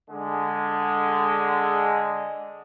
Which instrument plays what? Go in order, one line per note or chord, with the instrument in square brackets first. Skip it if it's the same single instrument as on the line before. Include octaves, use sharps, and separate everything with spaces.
[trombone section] D3 G#3